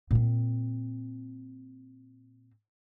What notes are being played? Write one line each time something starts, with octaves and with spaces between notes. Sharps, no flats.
A#2 C4